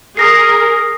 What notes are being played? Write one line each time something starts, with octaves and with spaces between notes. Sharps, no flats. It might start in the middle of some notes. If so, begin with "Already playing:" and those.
G#4 A#4 D#6 A#6 C7